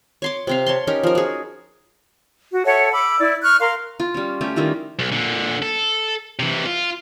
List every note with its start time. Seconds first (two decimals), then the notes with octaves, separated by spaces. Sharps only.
0.22 C#5 C6 D6
0.47 C3 C4 F5
0.66 C#5 A5 C6
0.87 C#4 D#4 G4 A#4
1.03 F3 A#4
1.15 F#4 G#4
2.51 F#4
2.65 A4 C#5 E5 F#5
2.93 B5 D6 E6
3.20 E4 D5
3.43 C#6 F6 F#6
3.60 A#4 F5 C6
4.00 F4
4.14 G3 C#4
4.41 A3 C#4 G4
4.56 D#3 G3 E4 F4
4.99 B1
5.12 A#2 D3
5.62 A4
6.39 C3 E3
6.66 F4